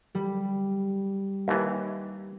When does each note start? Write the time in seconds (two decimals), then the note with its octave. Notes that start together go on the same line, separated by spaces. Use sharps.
0.15 G3
1.48 D#2 E3